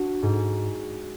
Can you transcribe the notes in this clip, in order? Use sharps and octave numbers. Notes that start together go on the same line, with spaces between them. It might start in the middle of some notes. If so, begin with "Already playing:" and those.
Already playing: D4 F#4
G#2